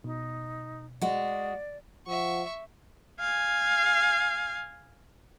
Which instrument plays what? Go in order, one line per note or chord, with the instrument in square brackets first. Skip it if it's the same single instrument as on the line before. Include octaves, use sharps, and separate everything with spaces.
[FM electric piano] B2 [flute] D#4
[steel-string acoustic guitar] G#3 F#4 [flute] D5
[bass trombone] F3 [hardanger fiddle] E5 C#6 [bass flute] F#5
[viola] F5 G#5